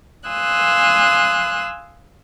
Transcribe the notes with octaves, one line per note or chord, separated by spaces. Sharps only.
F5 G#5 C6 D#6 E6 F#6